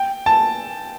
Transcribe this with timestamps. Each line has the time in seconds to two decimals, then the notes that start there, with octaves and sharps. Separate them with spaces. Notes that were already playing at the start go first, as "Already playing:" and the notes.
Already playing: G5
0.26 A5